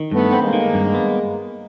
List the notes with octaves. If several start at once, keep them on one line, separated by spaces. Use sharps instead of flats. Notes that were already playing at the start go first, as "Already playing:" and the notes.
Already playing: D#3
G2 A3 B3
C4
G#3 A#3
D#3
G2
B3